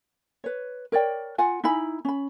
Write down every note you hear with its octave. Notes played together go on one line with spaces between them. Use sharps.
B4 C#5
A#4 C#5 D5 G5
F4 F#5 G#5
D#4 E4 G#5 B5
C#4 B5